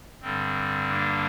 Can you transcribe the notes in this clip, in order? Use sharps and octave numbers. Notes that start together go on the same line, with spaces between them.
G2 D3 G3 C4
A#3 D4